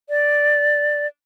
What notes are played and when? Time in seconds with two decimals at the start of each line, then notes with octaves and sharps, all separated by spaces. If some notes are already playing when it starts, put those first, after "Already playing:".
0.09 D5